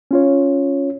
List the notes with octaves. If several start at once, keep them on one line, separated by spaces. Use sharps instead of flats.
C#4 F4 C#5